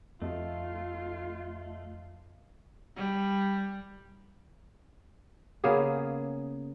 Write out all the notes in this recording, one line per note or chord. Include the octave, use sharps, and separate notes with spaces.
F2 A3 F4 D#5 A5
G3
C#3 A#3 B3 G#4